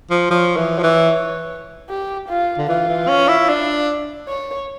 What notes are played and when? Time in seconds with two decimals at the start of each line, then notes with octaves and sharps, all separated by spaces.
0.10 F3
0.30 F3 C#5
0.57 E3
0.70 C#5
0.78 F3
0.83 E3
1.89 G4
2.28 F4
2.58 D3
2.68 E3 F4
2.89 E3
3.08 C#4
3.28 E4
3.49 D4
4.28 C#5